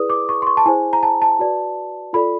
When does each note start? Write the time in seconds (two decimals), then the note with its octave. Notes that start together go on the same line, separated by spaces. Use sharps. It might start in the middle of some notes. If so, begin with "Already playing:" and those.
Already playing: E4 G#4 B4 D5 D#6
0.10 D6
0.29 C#6
0.42 C6
0.47 C#6
0.57 A5
0.66 E4 G#4 C5 G#5
0.93 A#5
1.03 A5
1.22 A5
1.39 F#4 B4 D5
2.13 F4 A4 D5 B5